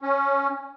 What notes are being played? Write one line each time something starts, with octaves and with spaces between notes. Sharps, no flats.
C#4